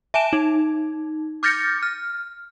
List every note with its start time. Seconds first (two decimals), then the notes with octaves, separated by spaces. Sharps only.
0.14 E5 G#5 A5 D7 E7
0.33 D#4
1.43 D6 F6 G6 A6 A#6 C#7
1.83 F6